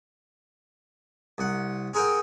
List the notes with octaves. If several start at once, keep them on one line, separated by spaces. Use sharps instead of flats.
C2 F#5
C4 G#4 A#4 F#5 G5